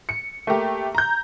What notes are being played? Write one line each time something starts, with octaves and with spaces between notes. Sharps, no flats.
C#7
A3 A#3 G4
A#5 G6